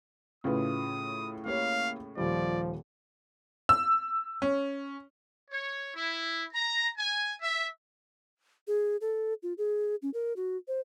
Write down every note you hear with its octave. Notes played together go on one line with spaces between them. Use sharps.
A2 C#3 F4 B4 D#6
A#3 G4 C#5 F5
D#1 F3 G3 D5
E6
C#4
C#5
E4
A#5
G#5
E5
G#4
A4
F4
G#4
C#4
A#4
F#4
C5